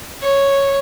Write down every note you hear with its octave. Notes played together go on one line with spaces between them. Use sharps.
C#5